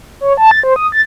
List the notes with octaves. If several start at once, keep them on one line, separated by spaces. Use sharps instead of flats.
C#5
A5
A6
C5
D#6
A6